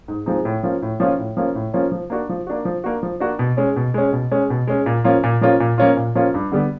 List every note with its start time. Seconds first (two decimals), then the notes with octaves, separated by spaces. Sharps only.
0.08 G#2
0.26 F3 G#3 C4 D#4
0.45 A2
0.63 F3 A#3 C#4 F4
0.82 A2
1.00 F3 A#3 C#4 F4
1.19 A2
1.37 F3 A#3 C#4 F4
1.55 A2
1.74 F3 A#3 C#4 F4
1.92 F3
2.10 A#3 D4 F#4
2.29 F3
2.47 A#3 D4 F#4
2.65 F3
2.84 A#3 D4 F#4
3.03 F3
3.20 A#3 D4 F#4
3.39 B2
3.57 G#3 C#4
3.76 B2
3.94 G#3 C#4
4.13 B2
4.31 G#3 C#4
4.50 B2
4.67 G#3 C#4
4.86 A#2
5.04 F3 A#3 C#4 F4
5.23 A#2
5.41 F3 A#3 C#4 F4
5.60 A#2
5.78 F3 A#3 C#4 F4
5.97 A#2
6.15 F3 A#3 C#4 F4
6.34 G2
6.52 D3 G3 B3